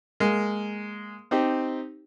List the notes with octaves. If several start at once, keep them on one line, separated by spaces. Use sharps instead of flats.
G#3 A#3
C4 D#4 G4